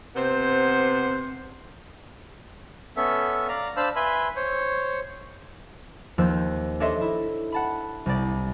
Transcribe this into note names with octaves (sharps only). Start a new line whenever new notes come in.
C3 B3 C5
B3 C#4 A4 E5
D5 F5 A#5
D4 C5 F5 A5 B5 E6
B4 E5 G#5 B5 C6
C5 C#5
D#2 F3 C5 C6 E6 F#6
D4 A4 C#5 D#5 E5 C6
E4
F#5 A5 B5
C2 D5